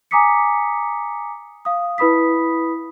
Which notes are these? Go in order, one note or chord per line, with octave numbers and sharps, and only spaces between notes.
G#5 A#5 D6 D#6 B6 C#7
F5 D#6
E4 B4 B5 D#6 B6